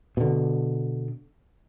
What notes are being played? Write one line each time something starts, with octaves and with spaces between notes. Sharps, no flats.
B2 D3